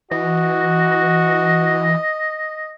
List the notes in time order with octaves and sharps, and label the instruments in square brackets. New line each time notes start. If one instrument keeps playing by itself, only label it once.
[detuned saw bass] E3 [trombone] F#4 [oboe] D#5